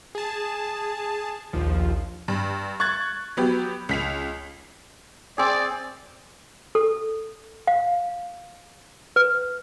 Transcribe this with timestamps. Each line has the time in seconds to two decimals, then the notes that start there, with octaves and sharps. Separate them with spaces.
0.15 G#4 A5
1.53 A#1 D#2 F3
2.28 G2
2.80 C#6 F#6 G#6 A6
3.37 F#3 B3 G4
3.89 C#2 B6 F7
5.38 C4 G#4 D5
6.75 A4
7.67 F5
9.16 B4